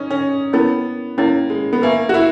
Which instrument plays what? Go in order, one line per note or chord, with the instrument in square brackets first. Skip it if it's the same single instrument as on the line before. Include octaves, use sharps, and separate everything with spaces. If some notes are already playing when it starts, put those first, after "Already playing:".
Already playing: [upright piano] C#4 D#4
C#4
[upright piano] B3 [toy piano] C#4 E4 A#4 C#5
[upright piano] A#3 [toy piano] C#4 E4 A#4 C#5
[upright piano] G#3
B3
[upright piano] A#3 [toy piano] B4 E5 G#5 C#6
[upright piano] F#4
E4